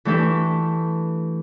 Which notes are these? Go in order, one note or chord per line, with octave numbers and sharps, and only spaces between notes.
E3 A3 D4 G4 A4 B4